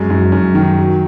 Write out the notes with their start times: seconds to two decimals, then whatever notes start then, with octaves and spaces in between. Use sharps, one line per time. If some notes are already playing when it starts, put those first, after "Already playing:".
Already playing: F#2 G#3
0.10 F#2
0.32 F#2
0.55 D#3
0.78 F#3